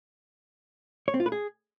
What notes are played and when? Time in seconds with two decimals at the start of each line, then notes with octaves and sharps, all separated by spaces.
1.08 C#5
1.14 C4
1.20 F4
1.26 B4
1.32 G#4